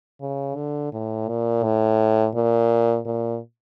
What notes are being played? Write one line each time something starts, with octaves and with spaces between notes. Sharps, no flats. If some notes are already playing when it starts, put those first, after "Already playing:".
C#3
D3
A2
A#2
A2
A#2
A#2